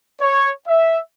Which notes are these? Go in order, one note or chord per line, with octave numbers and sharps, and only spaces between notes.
C#5
E5